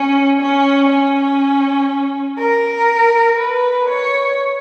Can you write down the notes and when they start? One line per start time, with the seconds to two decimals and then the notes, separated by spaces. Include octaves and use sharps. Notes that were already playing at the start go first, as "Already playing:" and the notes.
Already playing: C#4
0.41 C#4
0.90 C#4
2.39 A#4
3.38 B4
3.89 C#5